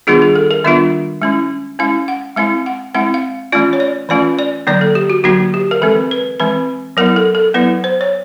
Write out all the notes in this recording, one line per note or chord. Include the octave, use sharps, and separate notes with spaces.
D#3 G3 B3 D4 F4 G#4
G#4
A4
A#4
D#3 G3 B3 D4 F4 E5
G#3 C#4 E4
G#3 C#4 E4 F5
F#5
G#3 C4 E4 F5
F#5
G#3 C4 E4 F#5
F5
E3 A3 C#4 F4 D5
C#5
D5
E3 A3 C#4 F4 D5
D5
D3 F#3 A#3 D#4 D5
A4
G4
F#4
D3 F#3 A#3 D#4 F#4
G4
A#4
E3 G#3 C4 A4
B4
E3 G#3 C4 B4
F#3 B3 E4 A#4
A4
A4
F#3 B3 E4 B4
C5
C#5